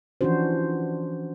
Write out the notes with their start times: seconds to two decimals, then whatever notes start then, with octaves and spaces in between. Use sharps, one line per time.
0.21 E3 F3 C#4 D4 F#4 C5